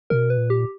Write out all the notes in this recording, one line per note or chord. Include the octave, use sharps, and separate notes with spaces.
B2 A#4
B4
A#2
G4